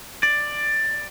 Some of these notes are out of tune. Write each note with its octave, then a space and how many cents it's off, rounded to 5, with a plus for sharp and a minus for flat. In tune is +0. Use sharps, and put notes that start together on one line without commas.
D5 +10